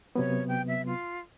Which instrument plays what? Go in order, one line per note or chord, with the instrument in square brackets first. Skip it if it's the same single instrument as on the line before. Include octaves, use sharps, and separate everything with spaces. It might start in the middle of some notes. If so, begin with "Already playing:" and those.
[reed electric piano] C3 F#3 B3 [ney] C#5
[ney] G5
E5
F4